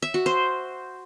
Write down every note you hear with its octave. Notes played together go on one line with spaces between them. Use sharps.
E5
F#4
C5